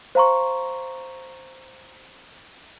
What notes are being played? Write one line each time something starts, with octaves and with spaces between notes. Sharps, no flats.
C5 F5 A#5 C6 C#6